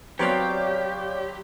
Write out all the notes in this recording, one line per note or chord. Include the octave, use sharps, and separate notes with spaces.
F#3 B3 C4 G4 C#5 D5 F5